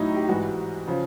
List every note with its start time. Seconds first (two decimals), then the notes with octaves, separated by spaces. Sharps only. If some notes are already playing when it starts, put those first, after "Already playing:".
Already playing: A2 F#3 D#4 E4
0.14 G4
0.29 G#2 E3 G3 F#4
0.87 C#3 F3